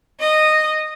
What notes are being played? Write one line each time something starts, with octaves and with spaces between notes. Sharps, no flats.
D#5